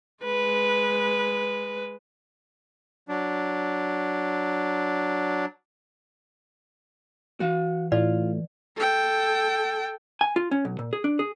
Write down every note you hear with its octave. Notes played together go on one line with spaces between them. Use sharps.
G#3 B4
F#3 D4
E3 F#4 F5
A2 F4 D5
A4 G5
G#5
F4
C#4
B1
A#2
G#4
D4
G#4